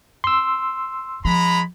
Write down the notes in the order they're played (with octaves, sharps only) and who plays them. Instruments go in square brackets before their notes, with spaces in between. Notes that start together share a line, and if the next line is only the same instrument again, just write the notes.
[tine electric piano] C6 E6
[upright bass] F3 [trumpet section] G#3 A#5 B5